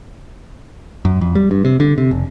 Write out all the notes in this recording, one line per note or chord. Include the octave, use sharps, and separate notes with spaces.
F#2
F2
G3
G2
C3
D3
C3
F1